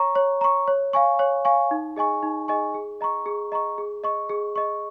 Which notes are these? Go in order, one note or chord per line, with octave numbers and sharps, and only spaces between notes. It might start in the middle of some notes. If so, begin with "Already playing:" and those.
Already playing: C#5 A#5 C#6
C#5
A#5 C#6
C#5
F5 G#5 C#6
C#5
F5 G#5 C#6
D#4
G#4 D#5 G#5 C#6
D#4
G#4 D#5 G#5 C#6
G#4
D#5 A#5 C#6
G#4
D#5 A#5 C#6
G#4
D#5 C#6
G#4
D#5 C#6